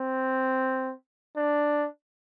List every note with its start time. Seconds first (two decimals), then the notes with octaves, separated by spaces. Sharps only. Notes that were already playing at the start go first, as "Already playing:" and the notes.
Already playing: C4
1.36 D4